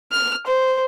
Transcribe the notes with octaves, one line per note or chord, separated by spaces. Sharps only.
F6
C5